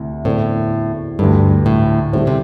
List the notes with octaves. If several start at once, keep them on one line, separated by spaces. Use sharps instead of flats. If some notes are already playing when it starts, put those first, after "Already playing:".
Already playing: D2 C3 E4
E2 A2 D3 C4 A4 D5
D2 G2 D3 G3
A2
A2 D3 G3 C4 E4 C5
C3